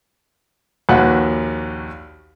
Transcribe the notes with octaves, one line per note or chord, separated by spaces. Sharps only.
A#1 D#2 F#4 B4 F#5 F#6